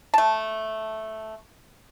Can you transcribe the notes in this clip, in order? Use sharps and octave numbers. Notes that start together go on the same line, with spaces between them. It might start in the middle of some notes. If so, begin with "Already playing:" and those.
A3 A5